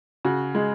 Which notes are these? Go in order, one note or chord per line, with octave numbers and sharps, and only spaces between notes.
C#3 F#4
G#3